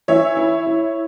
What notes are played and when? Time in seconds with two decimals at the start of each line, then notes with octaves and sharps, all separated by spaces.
0.08 E3 C#5 E5
0.37 E4
0.67 E4